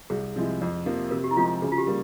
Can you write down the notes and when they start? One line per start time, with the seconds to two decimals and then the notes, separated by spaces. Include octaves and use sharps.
0.10 C2 G#4
0.36 C3 F3 G#3 E4
0.61 F2
0.86 C3 F3 A#3
1.11 C3 A#4
1.24 G4
1.31 E4
1.36 F3 G#3 C4 F4
1.62 C#3 G#4
1.72 F4
1.78 G4
1.87 G3 A#3